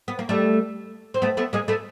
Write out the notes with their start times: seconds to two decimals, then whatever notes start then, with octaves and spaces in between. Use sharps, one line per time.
0.08 B3
0.19 A#3
0.29 G3 A3
1.14 C4
1.22 A3 B3
1.37 A3 B3
1.53 G#3 A#3
1.68 A3 B3